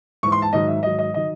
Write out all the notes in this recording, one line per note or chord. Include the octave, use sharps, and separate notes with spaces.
G#2 E3 C#6
C6
A5
G#2 D#3 F#3 D#5
E5
G#2 D#3 F#3 D#5
D#5
D#3 F#3 D#5